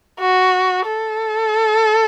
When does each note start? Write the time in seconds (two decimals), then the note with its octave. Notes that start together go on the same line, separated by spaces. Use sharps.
0.20 F#4
0.86 A4